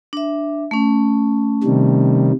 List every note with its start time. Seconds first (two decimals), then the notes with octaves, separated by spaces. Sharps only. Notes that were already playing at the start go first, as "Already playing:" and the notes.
0.13 D4 E5
0.71 A3 C#4
1.63 C3 D#3 G3